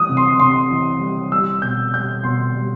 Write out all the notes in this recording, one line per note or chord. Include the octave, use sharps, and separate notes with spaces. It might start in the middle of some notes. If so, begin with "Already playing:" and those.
Already playing: E3 G3 D#6
C3
C6
C3 C6
E3
G3
G3 E6
B2 G6
G3 G6
B2 C6
G3